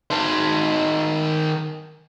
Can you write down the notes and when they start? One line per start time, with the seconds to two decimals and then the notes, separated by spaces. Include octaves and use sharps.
0.10 D#3 C5